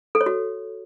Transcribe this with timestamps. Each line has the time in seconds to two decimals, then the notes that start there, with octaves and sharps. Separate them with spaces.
0.15 A4
0.21 C#5
0.26 F#4